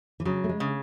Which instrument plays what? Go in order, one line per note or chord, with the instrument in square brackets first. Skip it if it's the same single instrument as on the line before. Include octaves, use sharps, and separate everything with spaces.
[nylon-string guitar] E3
[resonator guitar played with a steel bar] C#3 [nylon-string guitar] F#3
[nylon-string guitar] A3
G#3
[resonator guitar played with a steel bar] C#3